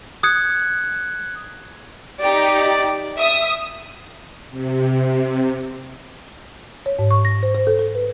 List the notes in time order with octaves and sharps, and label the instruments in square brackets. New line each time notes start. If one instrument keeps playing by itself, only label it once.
[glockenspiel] D#6 F#6 G#6 C#7
[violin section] D#4 G4 [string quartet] D5
[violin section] E5 D#6
[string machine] C3
[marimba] C#5
G#2
C#6
A#6
C5
C5
A4
A4
B4